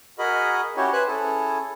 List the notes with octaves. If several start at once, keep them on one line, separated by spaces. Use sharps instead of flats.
F#4 G#4 A#4 D#5 B5
C#4 E4 F#4 G4 C#5
B4 C5 G#5 F#6
C#4 E4 G#4 A4